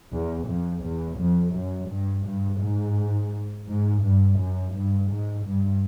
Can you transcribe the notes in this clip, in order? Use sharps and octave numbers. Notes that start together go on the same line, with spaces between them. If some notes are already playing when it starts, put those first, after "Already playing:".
E2
F2
E2
F2
F#2
G2
G2
G#2
G#2
G2
F#2
G2
G#2
G2